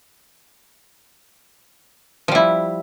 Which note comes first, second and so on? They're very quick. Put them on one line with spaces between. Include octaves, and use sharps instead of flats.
F3 G3 E4